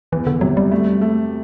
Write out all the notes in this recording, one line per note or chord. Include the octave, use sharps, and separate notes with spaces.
E2 E3
D3
C3 F#3
G3
A3
A3